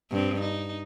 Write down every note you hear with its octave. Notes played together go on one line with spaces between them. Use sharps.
G2 C4
D#4